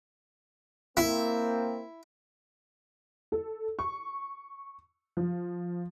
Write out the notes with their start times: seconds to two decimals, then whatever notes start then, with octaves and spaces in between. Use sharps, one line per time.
0.97 A#3 C4 E4
3.32 A4
3.79 C#6
5.17 F3